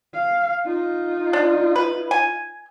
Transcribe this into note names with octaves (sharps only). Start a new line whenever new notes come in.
F5
D#4 F4
D4
B4
G#5